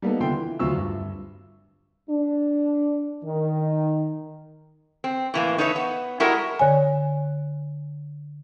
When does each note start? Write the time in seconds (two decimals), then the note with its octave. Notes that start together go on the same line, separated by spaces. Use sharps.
0.02 G3 A#3 B3 D#4 A4
0.20 D3 B3 F4 E5 G5 C6
0.37 E3
0.59 D2 F#3 F4 E5 C#6 E6
0.76 G2
2.10 D4
3.25 D#3
5.04 C4
5.34 A2 E3 A#3
5.58 D#4 A4 B4 C#5 D#5 E5
5.76 B3
6.20 G3 G#3 E4 F#4 A4 A#4
6.59 D3 C#5 G#5